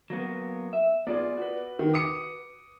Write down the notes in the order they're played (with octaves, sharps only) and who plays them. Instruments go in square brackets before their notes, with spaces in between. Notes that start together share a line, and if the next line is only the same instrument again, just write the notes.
[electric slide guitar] F#3 A#3 B3
E5
[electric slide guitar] B3 F4 G#4 [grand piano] D5
[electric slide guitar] F#4 B4
[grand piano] D#3
D6 D#6 C#7